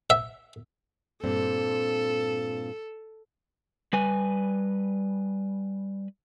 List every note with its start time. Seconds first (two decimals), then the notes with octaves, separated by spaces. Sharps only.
0.10 E5
1.24 G2 A#2 C4 A4
3.93 G3 B4 G#5